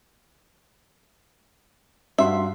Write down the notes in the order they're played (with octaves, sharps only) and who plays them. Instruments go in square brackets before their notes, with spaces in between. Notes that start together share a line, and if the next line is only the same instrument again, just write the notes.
[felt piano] G2 F#4 C6 [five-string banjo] E5